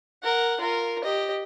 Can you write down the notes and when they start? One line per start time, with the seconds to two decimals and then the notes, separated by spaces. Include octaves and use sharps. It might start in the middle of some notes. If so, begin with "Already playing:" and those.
0.23 A#4 F#5
0.61 F4 A#4
1.04 G4 D#5